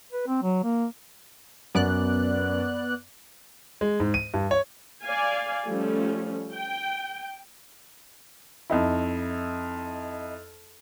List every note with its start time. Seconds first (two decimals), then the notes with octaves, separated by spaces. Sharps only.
0.12 B4
0.27 C4
0.43 F#3
0.64 A#3
1.75 F#2 B3 D5 F#6
3.81 G#3
4.00 G#2
4.14 D#7
4.34 G2
4.51 C#5
5.03 D5 F5 G#5
5.67 F3 G3 A3 C#4
6.53 G5
8.70 F2 D#4 E4